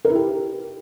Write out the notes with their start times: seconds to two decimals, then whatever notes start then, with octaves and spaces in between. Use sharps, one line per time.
0.05 A#4
0.10 E4
0.15 G4